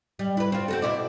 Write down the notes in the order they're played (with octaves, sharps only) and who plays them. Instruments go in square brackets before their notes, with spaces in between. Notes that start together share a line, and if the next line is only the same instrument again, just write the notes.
[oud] G3
E4 B4
C4 F4
C4 F#4 A4
B2 E4 D5